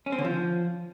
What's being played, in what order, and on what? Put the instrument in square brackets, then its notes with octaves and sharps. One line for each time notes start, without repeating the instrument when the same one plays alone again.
[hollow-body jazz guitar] C#4
C4
D3
F3